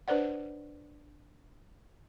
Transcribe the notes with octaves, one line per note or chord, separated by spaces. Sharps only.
D4 B4 C5 D5 F#5